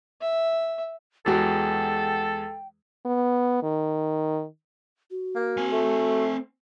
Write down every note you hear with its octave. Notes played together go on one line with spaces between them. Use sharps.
E5
E2 G#3 F#4 G4 A4 G5
B3
D#3
F#4
A#3
C4 G#5
A3